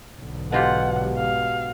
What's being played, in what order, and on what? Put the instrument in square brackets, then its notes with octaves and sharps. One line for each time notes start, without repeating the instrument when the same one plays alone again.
[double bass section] B1 G#2 D3
[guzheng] B2 F4 G4 [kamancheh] F#5
[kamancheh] F5